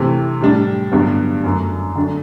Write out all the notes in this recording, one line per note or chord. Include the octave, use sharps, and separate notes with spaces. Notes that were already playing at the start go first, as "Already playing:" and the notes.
Already playing: C3 E3 A3
A2 G3 D4
G2 D3 F#3 B3 D4
F#2 F#3 A3
D3 F#3 A3 D4